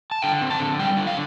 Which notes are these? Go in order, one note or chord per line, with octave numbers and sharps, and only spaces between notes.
A5
D3 G5
C4
A5
D3
G3 G5
D3
F5